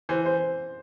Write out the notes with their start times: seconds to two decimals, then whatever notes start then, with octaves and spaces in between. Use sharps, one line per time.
0.09 E3 C5
0.26 C5